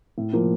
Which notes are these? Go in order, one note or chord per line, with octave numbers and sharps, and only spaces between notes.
A2
F3 A#3 F4